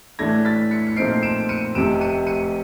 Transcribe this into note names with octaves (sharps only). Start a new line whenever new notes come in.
A2 E3 A3 D4 G#6 A#6
A6 B6
B6 C#7
C#7
A#2 F3 A3 C4 D#4 C7 D7
D7 E7
D7
C#7 D#7
F1 F2 C3 D7 E7
C#7 D#7
C#7 D#7